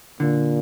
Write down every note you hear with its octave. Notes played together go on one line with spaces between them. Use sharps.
A#2 D3